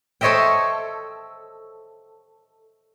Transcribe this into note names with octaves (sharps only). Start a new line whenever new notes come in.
A4 C5 C#5 D#5 E5 G5